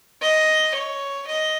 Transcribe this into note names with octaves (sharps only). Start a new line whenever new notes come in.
D#5
C#5
D#5